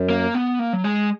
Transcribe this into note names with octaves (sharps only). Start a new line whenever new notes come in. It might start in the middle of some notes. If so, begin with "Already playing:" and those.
Already playing: F#2
A#3
B3
A#3
F#3
G#3